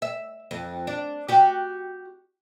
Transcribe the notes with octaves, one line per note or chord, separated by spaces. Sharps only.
E5
F2
D4
F#4 G4